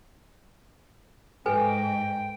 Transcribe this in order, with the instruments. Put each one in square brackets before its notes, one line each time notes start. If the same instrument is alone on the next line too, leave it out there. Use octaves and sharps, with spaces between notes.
[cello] G#2 [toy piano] A4 B4 G#5 [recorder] G5